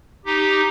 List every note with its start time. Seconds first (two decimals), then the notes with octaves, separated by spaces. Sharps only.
0.25 D#4 G4